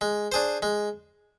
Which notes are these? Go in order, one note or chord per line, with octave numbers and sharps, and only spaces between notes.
G#3
D4 G#4 C5
G#3